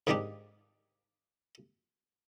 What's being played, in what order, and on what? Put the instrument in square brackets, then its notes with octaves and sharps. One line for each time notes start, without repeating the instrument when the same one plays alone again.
[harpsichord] G#2 D#3 F3 D4 D#4 G4